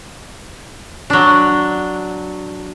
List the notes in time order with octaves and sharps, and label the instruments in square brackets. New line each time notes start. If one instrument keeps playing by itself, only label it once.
[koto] F#3 D4